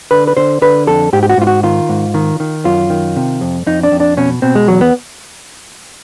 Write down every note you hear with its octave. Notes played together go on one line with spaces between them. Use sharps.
D3 B4
B4
D3 C5
D3 B4
F2 A4
G#2 G4
G4
F#4
G#2 F4
F#4
D#3 F4
G#2
D#3
D#3
F#2 F4
D#3
C3
F2
F2 D#4
D4
F2
D4
B2 C#4
B2 C4
G#3
E2 F#3
B3